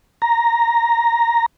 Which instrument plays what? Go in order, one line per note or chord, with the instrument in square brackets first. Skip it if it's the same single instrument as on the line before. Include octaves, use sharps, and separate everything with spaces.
[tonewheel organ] A#5